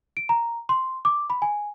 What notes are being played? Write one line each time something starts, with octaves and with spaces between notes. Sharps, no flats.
D7
A#5
C6
D6
B5
G#5